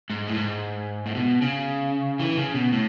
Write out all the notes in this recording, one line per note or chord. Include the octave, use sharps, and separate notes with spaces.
G#2
A2
G#2
A2
B2
C#3
E3
C#3
B2
A2